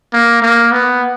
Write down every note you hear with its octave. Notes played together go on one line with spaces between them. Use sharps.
A#3
A#3
B3